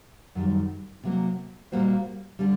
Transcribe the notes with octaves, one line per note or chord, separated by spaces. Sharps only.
F#2 D#3 G3
C3 F#3 A#3
A#2 G3 A#3 F#4 C5
D3 G3